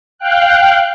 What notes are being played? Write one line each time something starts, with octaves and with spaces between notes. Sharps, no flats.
F5 G5 F#6